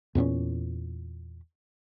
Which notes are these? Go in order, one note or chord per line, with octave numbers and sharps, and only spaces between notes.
E2 A#2 C4 C#4